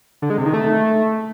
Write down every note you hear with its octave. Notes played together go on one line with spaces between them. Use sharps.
D3
G#3
C3
D#3
A3